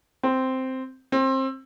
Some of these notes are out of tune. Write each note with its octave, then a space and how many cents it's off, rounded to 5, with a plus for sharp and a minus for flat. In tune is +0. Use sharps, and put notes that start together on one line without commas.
C4 -5
C4 +25